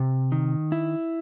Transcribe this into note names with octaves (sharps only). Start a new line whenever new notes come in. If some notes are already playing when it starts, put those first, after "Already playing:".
Already playing: C3
D#3
E4